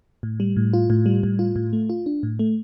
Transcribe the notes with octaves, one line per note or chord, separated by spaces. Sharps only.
A2
G3
A2
F4
A2
G3
A2
F4
A2
A3
F4
D4
A2
A3